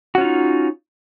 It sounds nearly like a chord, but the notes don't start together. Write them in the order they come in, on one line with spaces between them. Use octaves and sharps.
F#4 C#4 F4 D#4